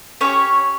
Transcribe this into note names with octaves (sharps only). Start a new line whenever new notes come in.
C#4 G4 C#5